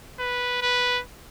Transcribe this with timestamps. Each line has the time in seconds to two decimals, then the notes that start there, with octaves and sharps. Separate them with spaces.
0.19 B4
0.62 B4